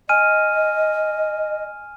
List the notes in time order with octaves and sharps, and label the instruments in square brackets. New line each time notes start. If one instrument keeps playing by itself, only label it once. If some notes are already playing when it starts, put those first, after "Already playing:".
[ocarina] D#5 [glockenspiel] G#5 F6 D#7